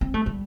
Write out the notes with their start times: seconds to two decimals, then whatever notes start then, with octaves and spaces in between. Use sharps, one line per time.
0.01 C4
0.14 A3
0.26 G3